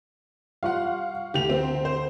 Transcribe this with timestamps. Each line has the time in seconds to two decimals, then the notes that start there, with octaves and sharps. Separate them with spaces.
0.63 G3 F4 F5 F#5 C#6
1.34 D2 G4 F7
1.49 C4
1.85 C5